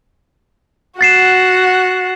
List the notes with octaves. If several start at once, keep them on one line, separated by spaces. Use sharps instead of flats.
F#4 F#5 A6 C7 E7